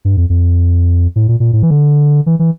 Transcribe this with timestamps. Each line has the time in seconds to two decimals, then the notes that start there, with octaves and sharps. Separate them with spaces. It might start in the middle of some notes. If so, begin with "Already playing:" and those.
0.05 G2
0.17 F2
0.30 F2
1.16 A2
1.28 A#2
1.40 A#2
1.53 A2
1.63 E3
1.71 D3
2.26 E3
2.39 E3